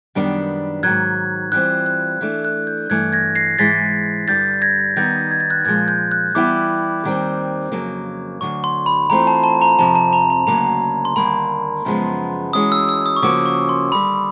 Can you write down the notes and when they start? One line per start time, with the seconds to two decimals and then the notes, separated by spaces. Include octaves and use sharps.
0.15 F#2 D#3 G3 B3 D4
0.83 G#2 D#3 F#3 F#6 G#6
1.52 E3 G3 C4 F4 F#6
1.86 F#6
2.21 E3 A3 D4
2.45 F#6
2.67 G6
2.90 G2 E3 A3 F#6 G#6
3.13 G#6 A#6
3.36 A#6 C7
3.59 G#2 E3 G#3 A6 B6
4.28 G2 D3 G3 G6 A6
4.62 G#6 A#6
4.96 D#3 G3 B3 D#4 G6 A6
5.31 G#6
5.41 A6
5.50 F#6 G#6
5.65 A#2 F3 G#3 F#6 G#6
5.88 G6
6.12 F#6
6.35 E3 G3 B3 E4 G4 D6
7.04 D#2 D#3 G3 C4
7.72 F2 C#3 F#3 A#3
8.41 D2 D3 F#3 C#6
8.64 C6
8.86 B5
9.10 E3 A3 C4 F4 A#5
9.27 A5
9.44 A5
9.62 A#5
9.79 F2 C3 F3 A5
9.95 A5
10.13 A#5
10.30 A#5
10.47 D2 C#3 F#3 A#3 A#5
11.05 C6
11.16 D#2 D3 G3 A#3 B5
11.85 F#2 C#3 F3 G#3 B3
12.53 E3 G#3 C#4 F#4 D#6
12.72 E6
12.89 E6
13.06 D#6
13.16 C#6
13.22 C#3 F3 A#3 C#4 F#4 D6
13.46 C#6
13.69 C6
13.91 D#2 D3 G3 B5